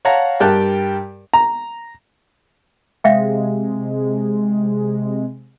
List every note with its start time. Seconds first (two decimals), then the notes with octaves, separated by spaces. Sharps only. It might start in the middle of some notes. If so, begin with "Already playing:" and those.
0.05 C#5 F5 F#5 A5 A#5
0.40 G2 G4 A#4 G5 A5 F#6
1.34 A#5
3.04 C3 G#3 E5 F5 G5